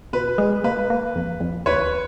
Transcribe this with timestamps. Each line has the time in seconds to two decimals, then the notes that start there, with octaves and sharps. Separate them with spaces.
0.13 B2 B4
0.38 G#3
0.64 A#3 B4
0.90 A#3
1.16 F2
1.40 F2
1.66 D#2 B4 C#5